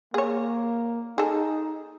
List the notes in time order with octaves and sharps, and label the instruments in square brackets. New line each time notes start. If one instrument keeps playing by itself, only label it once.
[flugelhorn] A#3 [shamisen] G#4 C#5
[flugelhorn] D#4 [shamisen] G#4 A4